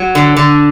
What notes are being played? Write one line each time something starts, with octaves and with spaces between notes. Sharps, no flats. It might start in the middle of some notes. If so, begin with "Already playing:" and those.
Already playing: F#3
D3
D3